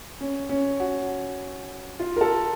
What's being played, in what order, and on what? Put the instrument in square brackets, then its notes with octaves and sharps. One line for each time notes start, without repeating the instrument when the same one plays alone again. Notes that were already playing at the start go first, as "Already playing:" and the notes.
[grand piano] C#4
C#4
F#4
F4
A#4
A4